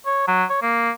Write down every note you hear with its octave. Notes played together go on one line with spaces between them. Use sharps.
C#5
F#3
C#5
A#3